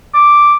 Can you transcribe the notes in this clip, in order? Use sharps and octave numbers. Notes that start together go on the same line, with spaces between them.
D6